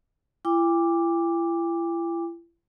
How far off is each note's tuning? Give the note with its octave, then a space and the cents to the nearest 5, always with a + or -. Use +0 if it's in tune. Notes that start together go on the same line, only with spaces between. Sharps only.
E4 +40 G5 +45 D6 +0